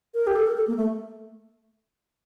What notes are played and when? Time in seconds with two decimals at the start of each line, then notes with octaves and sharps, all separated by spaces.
0.14 A#4
0.27 G4
0.36 A4
0.47 A#4
0.57 A4
0.68 A#3
0.77 A3